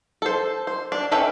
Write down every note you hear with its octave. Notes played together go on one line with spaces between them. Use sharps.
A4 C5
C5
D4
C#4 A4 B4 E5 G5